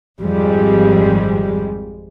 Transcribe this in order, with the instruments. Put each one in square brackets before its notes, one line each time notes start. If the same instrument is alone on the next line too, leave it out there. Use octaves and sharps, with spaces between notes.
[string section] G#1 F2 G3 G#3